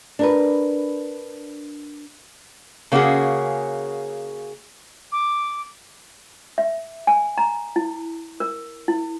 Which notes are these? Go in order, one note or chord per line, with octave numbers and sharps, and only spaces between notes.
D4 A#4 B4
C#3 A#3 C#4 F#4 G#4
D6
E5
G#5
A#5
E4
A#4
E4